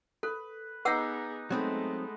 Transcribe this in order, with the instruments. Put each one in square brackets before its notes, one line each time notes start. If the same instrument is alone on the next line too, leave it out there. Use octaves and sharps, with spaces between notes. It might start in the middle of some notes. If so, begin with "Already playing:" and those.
[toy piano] A4 [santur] B4
[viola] B3 G#4 [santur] D#4 D6 [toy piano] B4 F#5 E6
[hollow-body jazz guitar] F#3 C4 D#4 [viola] G#3 A3 [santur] B3